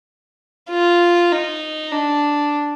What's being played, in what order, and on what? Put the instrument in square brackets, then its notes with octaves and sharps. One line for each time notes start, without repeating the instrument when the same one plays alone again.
[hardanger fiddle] F4
D#4
D4